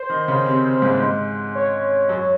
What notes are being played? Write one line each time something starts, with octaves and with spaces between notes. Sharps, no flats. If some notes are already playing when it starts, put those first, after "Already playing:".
Already playing: C5
D#3 D#4
C#3 C#4
C3 C4
G#2 G#3
G#2 G#3
C#5
F#2 F#3